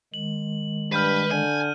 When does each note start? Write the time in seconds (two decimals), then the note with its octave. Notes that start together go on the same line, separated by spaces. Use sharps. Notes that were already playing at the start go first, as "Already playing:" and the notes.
0.14 D#3 G#3 F#7
0.92 G2 B4 F6 G6 D#7
1.31 D3 G#5 D#7